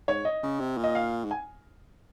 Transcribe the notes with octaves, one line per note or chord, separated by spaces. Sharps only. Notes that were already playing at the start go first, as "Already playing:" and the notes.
G#2 C#5
D#5
C#3
C3
A#2
D#5
F5
G#2
G#5